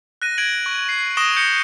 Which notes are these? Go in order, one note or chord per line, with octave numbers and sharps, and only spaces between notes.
F#6 A#6 D#7
G#6 D7 F#7
C#6
C7
C#6 D#6 A#6 D7 E7 G7
G6 A#6 C#7